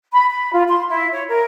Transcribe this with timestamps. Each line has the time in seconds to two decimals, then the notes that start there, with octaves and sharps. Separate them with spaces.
0.14 B5
0.29 B5
0.53 F4
0.69 C6
0.89 E4
1.13 C#5
1.28 A#4